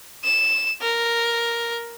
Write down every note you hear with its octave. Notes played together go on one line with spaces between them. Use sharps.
E7
A#4